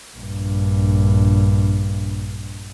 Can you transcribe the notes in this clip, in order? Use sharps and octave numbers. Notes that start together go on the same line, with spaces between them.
A#1 G2